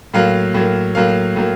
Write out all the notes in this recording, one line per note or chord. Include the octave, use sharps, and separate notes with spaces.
A2 F#3 A#3 F5
A2 F#3 A#3
A2 F#3 A#3 F5
A2 F#3 A#3